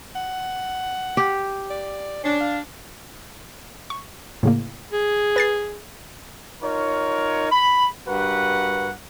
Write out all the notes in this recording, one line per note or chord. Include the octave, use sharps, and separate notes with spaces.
F#5
G4
D5
C#4 D4
F5
C#6
A2 C#3 A#3
G#4
B4 A6 C7
D#4 F4 A#4 C#5
B5
G2 F#4 A#4 B4 F#5